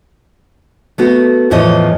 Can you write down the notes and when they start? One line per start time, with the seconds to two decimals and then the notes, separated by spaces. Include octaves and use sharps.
0.98 A3 B3 F#4
1.51 E2 A2 E3 F3 C#5 D#5